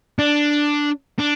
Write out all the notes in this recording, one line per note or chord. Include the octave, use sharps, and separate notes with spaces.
D4
D4